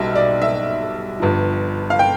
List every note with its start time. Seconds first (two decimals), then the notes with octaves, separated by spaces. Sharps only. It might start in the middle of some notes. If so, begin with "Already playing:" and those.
Already playing: B1 B2 G3 E5
0.15 D5
0.42 E5
1.20 G1 G2 F3
1.90 F5
1.99 G5